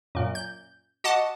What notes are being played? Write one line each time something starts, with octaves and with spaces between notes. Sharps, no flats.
F#2 A#2
G6
F#4 D#5 F#5 A5 D6